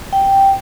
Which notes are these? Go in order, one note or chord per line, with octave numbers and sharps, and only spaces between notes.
G5